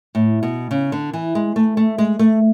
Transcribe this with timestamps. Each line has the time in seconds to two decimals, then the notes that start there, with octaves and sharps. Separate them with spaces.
0.15 A2
0.43 B2
0.71 C#3
0.92 D3
1.13 E3
1.35 G#3
1.56 A3
1.77 A3
1.98 G#3
2.19 A3